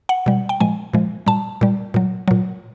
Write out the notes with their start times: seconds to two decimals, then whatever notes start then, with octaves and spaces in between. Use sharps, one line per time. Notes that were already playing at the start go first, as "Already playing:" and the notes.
0.09 F#5
0.26 B2 G3
0.49 G5
0.60 A#2 F3 G#3 G#5
0.94 A#2 F3 G#3
1.27 A#2 G3 A5
1.61 A#2 G3
1.94 A#2 F#3
2.28 A#2 F#3